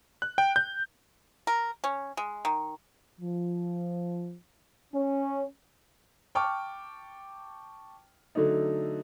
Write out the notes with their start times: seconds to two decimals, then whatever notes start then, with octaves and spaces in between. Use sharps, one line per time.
0.22 F#6
0.38 G5
0.56 G6
1.47 A#4
1.84 C#4
2.17 G#3
2.45 D#3
3.21 F3
4.93 C#4
6.35 G5 A5 C#6 D6 F6
8.35 D3 F#3 A3 D#4